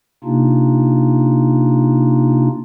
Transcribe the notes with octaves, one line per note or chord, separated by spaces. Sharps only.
C3 A#3 D4 D#4 F4